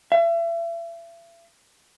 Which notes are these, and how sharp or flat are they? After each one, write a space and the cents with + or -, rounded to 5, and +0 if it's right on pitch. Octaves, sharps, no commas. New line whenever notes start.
E5 +35